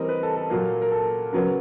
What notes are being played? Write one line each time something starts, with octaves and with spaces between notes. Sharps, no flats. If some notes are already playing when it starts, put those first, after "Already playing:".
Already playing: E3 G3 C4 A#4 D#5
B4
A4
A4
A#2 F#3 A#3
A#4
A4
C#3 F#3 B3 A#4